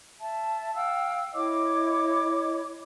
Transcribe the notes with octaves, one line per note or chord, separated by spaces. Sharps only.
E5 A5
F5 G5 E6
E4 C#5 D#5 D6